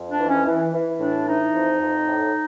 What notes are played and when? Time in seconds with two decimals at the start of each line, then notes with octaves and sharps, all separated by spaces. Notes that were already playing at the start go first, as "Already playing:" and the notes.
Already playing: F2
0.09 D4
0.19 E3
0.29 C#4
0.46 E3
0.73 E3
1.00 A2 D4
1.27 E3 D#4
1.55 F2
1.81 F2
2.08 A2